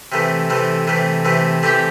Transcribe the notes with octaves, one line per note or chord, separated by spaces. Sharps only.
C3 E3 A3
C3 E3 A3
C3 E3 A3
C3 E3 A3
E3 A3 C4 G4